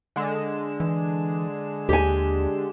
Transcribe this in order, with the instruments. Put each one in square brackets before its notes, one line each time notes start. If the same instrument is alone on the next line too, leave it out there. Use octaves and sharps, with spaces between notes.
[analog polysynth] D3 G#3 E7
[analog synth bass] E3
[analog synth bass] D#2 [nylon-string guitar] G4 G#5